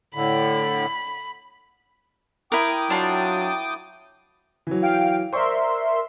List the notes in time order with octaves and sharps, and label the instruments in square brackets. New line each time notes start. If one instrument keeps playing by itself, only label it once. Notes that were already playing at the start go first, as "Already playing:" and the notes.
[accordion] A2 D3 [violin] B5
[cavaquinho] E4 A#4 [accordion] G5 D6 D#6
[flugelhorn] F#3 [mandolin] D4 F4
[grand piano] E3 F#3
[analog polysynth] F5 G5 D7
[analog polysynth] A#4 E5 C6 [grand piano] C5 D5 C#6